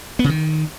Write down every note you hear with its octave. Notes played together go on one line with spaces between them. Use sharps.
B3
C#3
D#3